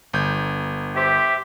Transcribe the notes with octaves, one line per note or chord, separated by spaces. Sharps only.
G1 G6
G4 C5 E5